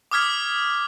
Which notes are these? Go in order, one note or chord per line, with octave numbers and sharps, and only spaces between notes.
D6 D#6 F6 G#6 B6